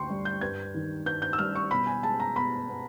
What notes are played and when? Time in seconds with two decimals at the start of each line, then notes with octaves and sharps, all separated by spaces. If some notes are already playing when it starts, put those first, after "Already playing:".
Already playing: D2 D3 G5 C6 C#6
0.10 G3
0.25 G6
0.41 G2 G#6
0.74 D#3
1.06 G2 G6
1.22 G6
1.33 E6
1.39 G3 F6
1.56 C#6
1.71 B2 B5
1.87 G#5
2.03 G#3 A5
2.20 A#5
2.36 B2 B5
2.69 B3